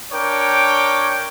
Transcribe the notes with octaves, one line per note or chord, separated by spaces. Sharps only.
D4 A#4 C#5 G5 D6